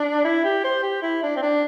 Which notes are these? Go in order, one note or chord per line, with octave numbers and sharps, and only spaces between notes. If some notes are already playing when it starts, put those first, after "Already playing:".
Already playing: D4
E4
G4
C5
G4
E4
D4
C4
D4